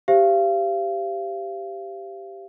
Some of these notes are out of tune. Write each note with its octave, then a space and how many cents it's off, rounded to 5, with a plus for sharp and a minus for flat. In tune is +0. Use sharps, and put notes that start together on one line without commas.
G4 +0 C5 +0 F5 -35